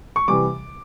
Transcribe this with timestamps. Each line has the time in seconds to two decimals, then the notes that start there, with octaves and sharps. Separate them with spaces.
0.16 C#6
0.28 C3 E3 G3 D6